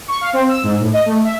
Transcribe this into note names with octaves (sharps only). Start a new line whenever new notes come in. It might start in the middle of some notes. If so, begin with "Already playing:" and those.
C#6
F5
C4
E6
G#2
A2
D#5
A3
E5